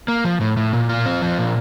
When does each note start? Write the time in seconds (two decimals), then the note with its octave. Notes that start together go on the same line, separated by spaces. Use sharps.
0.08 A#3
0.25 F3
0.41 A2
0.57 A2
0.73 A#2
0.89 F4
1.06 C4
1.22 F3
1.38 A#2